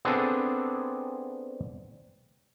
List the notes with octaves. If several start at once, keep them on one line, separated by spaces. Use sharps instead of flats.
B3 C4 D4 G#4 A4